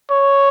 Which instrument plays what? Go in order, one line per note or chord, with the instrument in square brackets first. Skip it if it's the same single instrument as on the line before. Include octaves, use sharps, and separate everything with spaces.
[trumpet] C#5